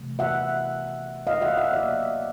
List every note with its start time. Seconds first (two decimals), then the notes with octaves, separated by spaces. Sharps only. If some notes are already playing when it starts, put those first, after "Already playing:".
Already playing: C3 E3 A3
0.19 E5 F#5
1.27 D#5 F5
1.42 E5 F#5
1.57 E5 F#5
1.72 B2 F#3 A#3 D5 E5